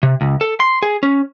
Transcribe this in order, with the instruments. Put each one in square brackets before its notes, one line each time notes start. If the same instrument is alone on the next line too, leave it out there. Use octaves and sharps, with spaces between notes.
[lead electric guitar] C3
C#2
A4
C6
G#4
C#4